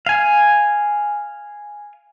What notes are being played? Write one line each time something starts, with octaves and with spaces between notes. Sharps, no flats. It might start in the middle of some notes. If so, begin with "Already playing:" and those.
F5 G#5